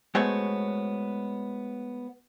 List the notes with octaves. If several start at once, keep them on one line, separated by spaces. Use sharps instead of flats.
G#3 A3 B3 F#4 C5 C#5